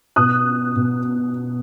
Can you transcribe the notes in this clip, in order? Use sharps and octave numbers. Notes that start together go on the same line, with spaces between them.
B2 D#6 F#6
B2